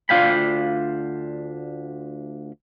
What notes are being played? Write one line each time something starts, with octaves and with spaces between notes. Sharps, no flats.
D2 D4 F4 F5 G5 B5